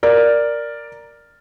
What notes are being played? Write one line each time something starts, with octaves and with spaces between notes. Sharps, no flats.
A#4 D5